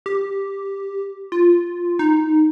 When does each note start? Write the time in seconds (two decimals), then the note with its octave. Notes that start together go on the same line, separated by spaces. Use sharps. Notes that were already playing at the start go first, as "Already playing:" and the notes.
0.06 G4
1.32 F4
1.99 D#4